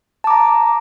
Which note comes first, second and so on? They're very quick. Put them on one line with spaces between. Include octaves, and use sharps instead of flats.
A5 D6 A#5